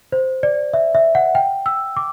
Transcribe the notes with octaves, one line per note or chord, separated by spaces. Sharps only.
C5
D5
E5
E5
F#5
G5
E6
D6